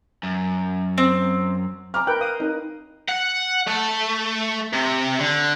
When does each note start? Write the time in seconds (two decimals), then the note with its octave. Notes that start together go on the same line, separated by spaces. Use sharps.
0.23 F#2
0.98 C4
1.94 A#5 D6 F6
2.07 A#4 B4 G5 F#6
2.21 F5 D#6
2.40 D#4 A#4
3.08 F#5
3.67 A3
4.73 C3
5.20 D3